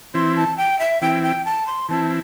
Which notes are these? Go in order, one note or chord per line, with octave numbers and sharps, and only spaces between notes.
E3 C4 E4 C6
A5
G5
E5
E3 C4 E4 G5
G5
A5
C6
E3 C4 E4 A5